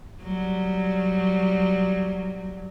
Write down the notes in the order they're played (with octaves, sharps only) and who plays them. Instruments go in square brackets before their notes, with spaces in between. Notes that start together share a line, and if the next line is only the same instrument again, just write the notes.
[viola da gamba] F#3 G3